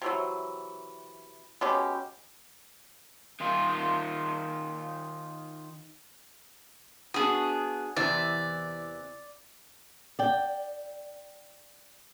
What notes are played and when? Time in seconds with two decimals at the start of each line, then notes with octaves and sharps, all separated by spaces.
0.02 C3 E3 F#3
1.61 B2 G#3 C#4 G4
3.40 D#3 F4
7.14 B3 D4 F#4 G#4 D#6
7.96 E2 C3 E3 D5
10.19 D5 G5